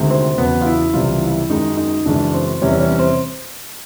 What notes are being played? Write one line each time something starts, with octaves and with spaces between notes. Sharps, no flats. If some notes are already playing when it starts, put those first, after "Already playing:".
Already playing: D2 C3 D#3 G#3
C4
E2 C#3 F#3 B3
F4
E4
C#2 C3 E3 G3 F4
E4
F#2 D#3 G#3 D#4
D#4
F#2 C#3 E3 G#3 D4
C4
E2 C3 E3 G3 C#4
C#4
C#4
C4